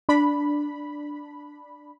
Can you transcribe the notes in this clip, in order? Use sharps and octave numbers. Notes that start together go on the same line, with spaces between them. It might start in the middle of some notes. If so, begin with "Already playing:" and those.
D4 B5